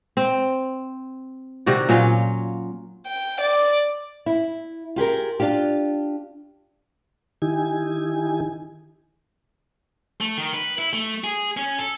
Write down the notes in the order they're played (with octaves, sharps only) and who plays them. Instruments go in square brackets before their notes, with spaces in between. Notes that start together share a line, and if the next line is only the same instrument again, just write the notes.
[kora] C4
C3 D#3 F#4 D5
A#2 F#3 C#4 F4
[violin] G5
D5
[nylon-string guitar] E4
F4 G4 G#4 A#4
D4 F4 G4
[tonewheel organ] D#3 D#4 E4 G4 G#5
[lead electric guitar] A3
D#3
B4
E4
A3
G#4
C#4
A4